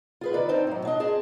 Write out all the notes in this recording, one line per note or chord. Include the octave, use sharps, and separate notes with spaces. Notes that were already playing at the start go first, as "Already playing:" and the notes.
F4 G#4 B4
D#3 B4 D5
C4 D4 D#4 C5
A2 F#3
D4 D#5
C4 G#4 A5